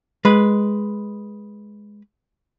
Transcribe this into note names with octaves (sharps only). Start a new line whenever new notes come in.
G#3 B4